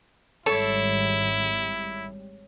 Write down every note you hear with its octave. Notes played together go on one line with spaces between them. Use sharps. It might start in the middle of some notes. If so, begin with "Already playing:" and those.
G#1 G#2 G3 E4 A4 C#5